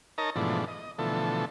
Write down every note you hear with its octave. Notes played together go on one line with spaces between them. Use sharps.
D#4 A#4 C#5 D#5 A5 A#5
G#2 B2 E3 F3 A3 D4
D#5
B2 D3 E3 F3 A3 A4